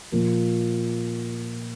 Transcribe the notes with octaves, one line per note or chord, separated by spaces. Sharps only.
A#2 F3 A#3